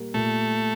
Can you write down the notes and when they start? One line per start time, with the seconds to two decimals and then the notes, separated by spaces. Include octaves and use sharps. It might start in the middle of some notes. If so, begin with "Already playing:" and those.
Already playing: A#2 G3 A#3
0.14 A#2 A3